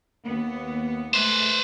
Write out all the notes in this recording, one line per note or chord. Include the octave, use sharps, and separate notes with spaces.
D#2 B3
G#3 A3 B4 C5